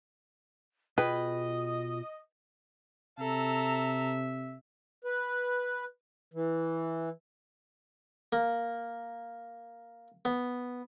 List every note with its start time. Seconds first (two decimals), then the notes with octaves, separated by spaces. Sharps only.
0.98 B2 F4 G#4 B4 D#5 G5
3.19 C3 A4 E5 A#5
5.05 B4
6.34 E3
8.33 A#3
10.25 B3